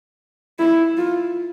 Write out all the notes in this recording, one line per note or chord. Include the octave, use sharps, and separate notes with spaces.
E4
F4